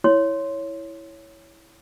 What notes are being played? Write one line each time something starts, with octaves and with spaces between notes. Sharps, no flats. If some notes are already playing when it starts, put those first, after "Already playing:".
E4 C#5 C6